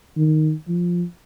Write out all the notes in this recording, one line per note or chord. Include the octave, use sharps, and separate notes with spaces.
D#3
F3